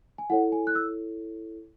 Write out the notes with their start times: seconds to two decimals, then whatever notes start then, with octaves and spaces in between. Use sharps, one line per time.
0.18 G#5
0.30 E4 A4 C#5 F#5
0.52 G#5
0.67 F#6
0.75 E6